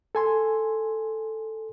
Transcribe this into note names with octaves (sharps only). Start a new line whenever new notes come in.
A4 G#5 C6